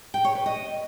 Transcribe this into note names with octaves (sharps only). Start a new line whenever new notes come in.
G5
C#5
B4
D#5